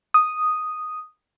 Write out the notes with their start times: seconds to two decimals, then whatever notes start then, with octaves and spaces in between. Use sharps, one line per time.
0.14 D#6